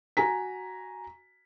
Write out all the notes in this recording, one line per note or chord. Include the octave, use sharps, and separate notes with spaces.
F#4 G#5 A#5 B6